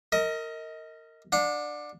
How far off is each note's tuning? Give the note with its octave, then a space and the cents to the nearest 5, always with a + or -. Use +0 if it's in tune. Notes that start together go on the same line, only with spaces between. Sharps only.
A#4 -20 D#5 +25
D4 +15 F#5 -35